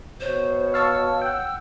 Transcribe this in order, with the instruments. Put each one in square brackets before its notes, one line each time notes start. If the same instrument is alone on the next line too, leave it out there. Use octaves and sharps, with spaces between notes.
[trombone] B2 [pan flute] C5 [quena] C#5
[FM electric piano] F5 A5 C#6 [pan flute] E6
[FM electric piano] F#5 G5